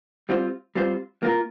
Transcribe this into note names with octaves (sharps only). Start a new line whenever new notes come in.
G3 C4 F4 C5
G3 C4 F4 C5
A#3 F4 A#4